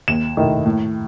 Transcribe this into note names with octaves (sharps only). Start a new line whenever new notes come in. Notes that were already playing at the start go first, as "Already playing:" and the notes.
D#2 E7
D#3 A3 E4
A2